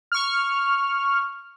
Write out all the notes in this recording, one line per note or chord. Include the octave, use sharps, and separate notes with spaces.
C#6 F6